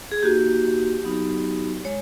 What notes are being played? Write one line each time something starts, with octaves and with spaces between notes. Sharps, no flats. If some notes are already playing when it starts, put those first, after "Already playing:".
G#4
A#3 D#4 F#4 G4
F#3 B3 D#4 F#4
G#3 C#5